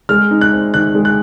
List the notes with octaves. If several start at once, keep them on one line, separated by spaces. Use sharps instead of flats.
G#3 F6
D#4
F#6
C4
D#3 F#6
G#3
F#6